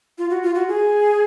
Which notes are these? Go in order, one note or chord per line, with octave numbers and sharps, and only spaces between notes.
F4
F#4
F4
F#4
G#4